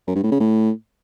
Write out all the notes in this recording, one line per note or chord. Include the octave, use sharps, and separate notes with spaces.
F#2
G2
A2
C#3
A2